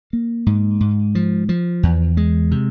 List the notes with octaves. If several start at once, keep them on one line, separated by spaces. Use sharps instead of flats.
A#3
G#2
G#2
F3
F3
E2
G#3
C3